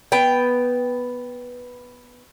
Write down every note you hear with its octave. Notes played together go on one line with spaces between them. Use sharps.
B3 G5